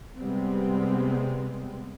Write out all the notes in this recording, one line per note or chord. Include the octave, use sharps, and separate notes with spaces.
C3 G3 G#3 B3 C4